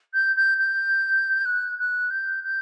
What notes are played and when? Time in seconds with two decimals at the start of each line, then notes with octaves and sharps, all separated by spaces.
0.13 G6
0.36 G6
0.58 G6
1.45 F#6
1.78 F#6
2.10 G6
2.43 G6